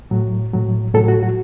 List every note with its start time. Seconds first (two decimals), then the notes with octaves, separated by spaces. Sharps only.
0.11 A2 F#3
0.53 A2 F#3
0.94 A2 F#3 A4
1.08 F#4
1.23 F#4